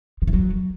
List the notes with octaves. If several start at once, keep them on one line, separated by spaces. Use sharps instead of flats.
D#3
E3
F#3